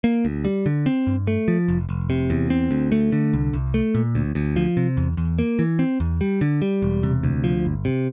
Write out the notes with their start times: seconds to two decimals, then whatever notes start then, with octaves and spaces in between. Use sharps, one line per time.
0.04 A#3
0.25 D2
0.45 G3
0.66 D3
0.86 C4
1.07 G2
1.27 A3
1.48 F3
1.68 F1
1.89 F1
2.10 C3
2.30 E2
2.50 C4
2.71 D2
2.92 A3
3.12 D3
3.33 C2
3.53 C2
3.74 A3
3.95 A#2
4.15 D2
4.35 D2
4.56 F3
4.77 C3
4.97 E2
5.17 E2
5.39 A#3
5.59 E3
5.79 C4
6.00 E2
6.21 G3
6.41 D3
6.62 G3
6.82 E1
7.03 C3
7.23 D2
7.44 F3
7.65 G1
7.85 C3